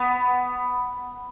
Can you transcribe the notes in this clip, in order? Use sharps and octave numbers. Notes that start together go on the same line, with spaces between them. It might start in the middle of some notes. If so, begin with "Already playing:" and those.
Already playing: B3